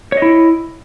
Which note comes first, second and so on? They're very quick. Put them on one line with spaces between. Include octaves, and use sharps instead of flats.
C#5 D#5 E4